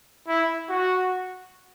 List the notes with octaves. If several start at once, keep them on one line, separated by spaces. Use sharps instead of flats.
E4
F#4